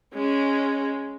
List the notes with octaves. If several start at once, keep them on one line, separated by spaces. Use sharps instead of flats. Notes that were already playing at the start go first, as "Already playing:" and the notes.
G#3 C#4